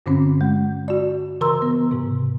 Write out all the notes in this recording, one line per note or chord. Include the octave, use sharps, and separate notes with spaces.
G2 D3 C4 C#4
G#3
F#4 D5
C#3 E3 A#4 A#5 C6 E6
B3
G#2 C3